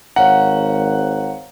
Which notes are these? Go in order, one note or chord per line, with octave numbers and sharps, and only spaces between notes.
G#1 C#5 F5 F#5 A#5